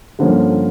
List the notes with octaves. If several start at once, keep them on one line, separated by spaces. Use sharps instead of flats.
G2 D3 F3 A#3 C#4